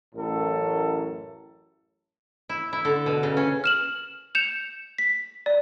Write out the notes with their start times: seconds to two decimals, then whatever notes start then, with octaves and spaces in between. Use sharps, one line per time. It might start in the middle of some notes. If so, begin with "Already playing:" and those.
0.15 A1 F#2 A2 A4 A#4
2.49 E4
2.73 E4
2.85 D3
3.06 B2
3.23 C#3
3.37 C#4
3.64 F6 E7 F#7
4.35 G6 C#7 E7 F7
4.98 B6
5.46 D5